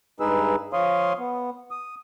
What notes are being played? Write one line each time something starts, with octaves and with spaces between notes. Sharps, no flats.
G2 G#3 D#4 G#4 B4 E6
F3 C#5 F5 C6 D#6
B3
D#6